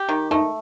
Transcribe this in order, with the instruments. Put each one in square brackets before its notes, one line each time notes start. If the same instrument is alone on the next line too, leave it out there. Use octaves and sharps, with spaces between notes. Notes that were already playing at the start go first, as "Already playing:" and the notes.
Already playing: [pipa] G4
D#3
[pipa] A3 [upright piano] D#4